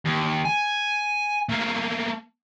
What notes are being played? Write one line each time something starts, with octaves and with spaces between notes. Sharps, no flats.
D#2
G#5
A3 A#3